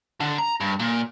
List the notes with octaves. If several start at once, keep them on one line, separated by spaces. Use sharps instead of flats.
D3
A#5
G2
A#2